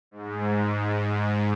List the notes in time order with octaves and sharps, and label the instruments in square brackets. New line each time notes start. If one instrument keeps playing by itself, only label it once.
[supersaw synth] G#2